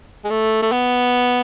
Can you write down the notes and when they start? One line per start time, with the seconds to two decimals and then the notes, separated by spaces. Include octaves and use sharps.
0.25 G#3
0.30 A3
0.62 A3
0.72 B3